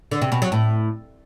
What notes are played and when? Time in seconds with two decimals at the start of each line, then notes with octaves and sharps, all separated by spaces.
0.11 D3
0.22 C3
0.32 B2
0.42 F#3
0.52 A2